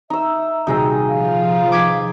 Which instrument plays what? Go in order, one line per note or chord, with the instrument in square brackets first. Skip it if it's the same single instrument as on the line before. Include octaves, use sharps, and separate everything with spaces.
[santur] D#4 E6 [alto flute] E5
[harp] D#1 C3 C4 [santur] D#4 G#4 D#5 [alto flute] F#4
[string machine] F3 F4 [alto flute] F5
[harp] D6 G#6 B6